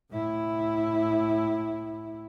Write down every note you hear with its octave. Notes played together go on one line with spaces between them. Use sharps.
A2 E4